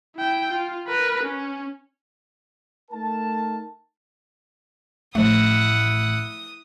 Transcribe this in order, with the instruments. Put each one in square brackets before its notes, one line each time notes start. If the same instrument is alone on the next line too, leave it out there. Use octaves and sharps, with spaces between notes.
[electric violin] E4 G5
F4
A#4 B4
C#4
[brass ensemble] A3 D#4 A#4 A5
[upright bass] A1 [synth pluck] F3 A3 [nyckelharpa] E4 F#5 [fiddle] D#6